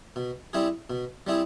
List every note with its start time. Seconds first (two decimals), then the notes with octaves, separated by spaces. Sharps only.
0.16 B2
0.53 G3 C4 E4 G#4
0.90 B2
1.27 G3 C4 E4 G#4